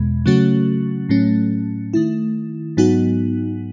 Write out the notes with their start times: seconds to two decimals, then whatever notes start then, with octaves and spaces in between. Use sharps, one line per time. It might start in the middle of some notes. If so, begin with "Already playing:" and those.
Already playing: E2 B2 G#3
0.26 C#3 F#3 A3 C#4 F#4
1.09 A2 F#3 A3 C#4
1.94 D#3 A3 E4
2.77 G#2 F#3 B3 D#4 F#4